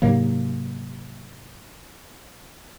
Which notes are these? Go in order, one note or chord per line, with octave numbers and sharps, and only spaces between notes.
G#2 C3 F#3 A#3